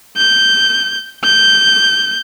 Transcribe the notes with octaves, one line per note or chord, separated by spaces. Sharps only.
G6
G6